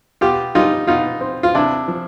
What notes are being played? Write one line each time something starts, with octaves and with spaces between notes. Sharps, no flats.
B2 F4 G4
G3 D#4 F4
B2 D#4 F4
C4
F4
C3 D4 E4
F3